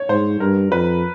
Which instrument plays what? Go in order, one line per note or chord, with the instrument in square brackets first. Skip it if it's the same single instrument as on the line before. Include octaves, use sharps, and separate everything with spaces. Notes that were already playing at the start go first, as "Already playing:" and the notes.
Already playing: [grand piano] C#5
[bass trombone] G#2 [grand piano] C5
[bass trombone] G2 [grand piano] A#4
[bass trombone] F2 [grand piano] B4